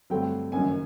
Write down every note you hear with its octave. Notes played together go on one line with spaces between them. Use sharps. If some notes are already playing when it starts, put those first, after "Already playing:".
G2 D3 F#3 A3 C4 G5
F#1 F#2 D#3 F#3 G#5